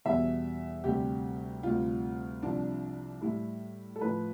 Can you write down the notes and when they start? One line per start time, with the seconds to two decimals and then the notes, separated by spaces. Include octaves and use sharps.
0.05 E2 B2 G3 E5
0.84 D2 C3 G3 G4
1.63 D2 C3 G3 F4
2.43 C2 C3 F3 D4
3.21 A2 G3 E4
3.96 A4
4.01 A2 F3 B4